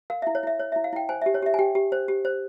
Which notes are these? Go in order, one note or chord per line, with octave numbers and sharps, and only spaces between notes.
A#4 F5
E5
E4
C#5
E4 E5
C#5
E5
E4
F5
E4 G5
C5 G#5
E5
G4
C#5
G4 E5
G#5
G4 G5
G4
C5
G4
C5